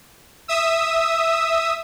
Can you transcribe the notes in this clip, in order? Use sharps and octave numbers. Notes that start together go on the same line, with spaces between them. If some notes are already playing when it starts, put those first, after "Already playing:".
E5 D#6 E6